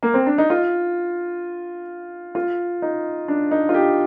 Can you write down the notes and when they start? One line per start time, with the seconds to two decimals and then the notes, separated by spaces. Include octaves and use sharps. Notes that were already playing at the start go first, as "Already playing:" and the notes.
0.03 A#3
0.14 C4
0.27 D4
0.38 D#4
0.50 F4
2.35 F4
2.82 D#4
3.28 D4
3.51 D#4
3.69 F4
3.74 G4